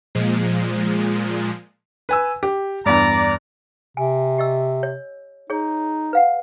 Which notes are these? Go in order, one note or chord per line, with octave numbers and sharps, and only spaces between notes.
A#2 F3 G#3
B4 G#5 E6
G4
E2 G2 D5 A#5
C3 G#5
G4 D#5 E6
C#5
D#4 G#4 C#5
B4 F5 F#5